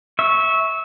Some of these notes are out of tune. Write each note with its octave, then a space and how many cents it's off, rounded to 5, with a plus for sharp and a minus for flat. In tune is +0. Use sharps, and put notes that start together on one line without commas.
E5 -20 C#6 +0